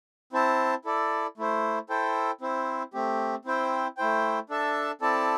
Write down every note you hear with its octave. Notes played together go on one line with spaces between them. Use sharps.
C4 E4 C5 A5
E4 A4 D5
A3 E4 C5
E4 A4 C5 G5
C4 E4 C5
A3 C4 G4
C4 E4 C5 G5
A3 E4 C5 G5
D4 A4 E5 A5
C4 E4 A4 D5 A5